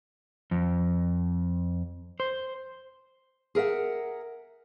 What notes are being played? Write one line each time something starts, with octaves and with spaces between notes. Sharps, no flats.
F2
C5
G#4 A#4 E5 F#5